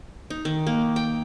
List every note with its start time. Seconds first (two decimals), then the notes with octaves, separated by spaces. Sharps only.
0.30 D#4
0.45 D#3
0.67 A#3
0.96 G5